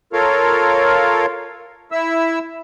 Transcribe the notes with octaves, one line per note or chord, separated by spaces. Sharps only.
F4 A4 A#4 C#5 F5
E4 E5 E6